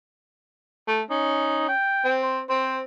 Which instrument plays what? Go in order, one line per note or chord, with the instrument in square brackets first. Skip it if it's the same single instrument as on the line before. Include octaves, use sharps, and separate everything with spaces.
[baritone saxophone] A3
[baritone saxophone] C#4 [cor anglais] D#4
[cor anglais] G5
[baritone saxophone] C4
[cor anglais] C5
[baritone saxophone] C4 [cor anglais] C5